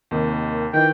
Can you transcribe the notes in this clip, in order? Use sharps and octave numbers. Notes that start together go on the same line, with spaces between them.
D#2 C3 D#3
D#3 E3 G5